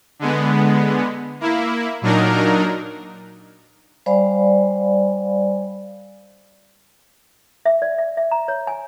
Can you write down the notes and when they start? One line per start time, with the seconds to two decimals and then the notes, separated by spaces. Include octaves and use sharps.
0.19 D3 G#3 B3
1.40 A#3 E4
2.02 A#2 F#3 D4 D#4 A#4
4.06 G3 C5 D5 F5 G#5 B5
7.66 E5
7.82 D5
7.98 E5
8.17 E5
8.31 A#5
8.48 C#5
8.67 G#5